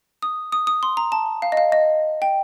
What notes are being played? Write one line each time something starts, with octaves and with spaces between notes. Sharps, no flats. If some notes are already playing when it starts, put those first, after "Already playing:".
D#6
D#6
D#6
C6
A#5
A5
F5
D#5
F5
D#5
G5